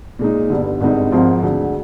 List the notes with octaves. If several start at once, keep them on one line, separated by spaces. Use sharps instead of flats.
A#2 G#3 D#4
G1 G2 D3
G#1 G2 D3 G#3 D#4
G#1 G#2 F3 C4 F4
D2 D3 G#3 D4